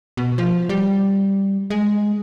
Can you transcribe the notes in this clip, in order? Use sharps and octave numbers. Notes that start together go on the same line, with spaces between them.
B2
F3
G3
G#3